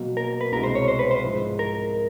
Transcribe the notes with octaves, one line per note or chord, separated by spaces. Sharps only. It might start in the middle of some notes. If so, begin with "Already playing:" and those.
Already playing: B2 F#3 A#3
A#4
B4
C2 B2 G#3 A#4
C5
C#5
C5
B4
C5
G#2 F3 G#3
A#4